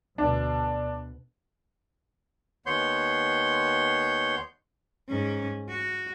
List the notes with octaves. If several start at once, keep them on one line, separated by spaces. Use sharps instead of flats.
D2 B2 D4
D#2 B3 C#5 C6 G6
G#2 C#4
F#4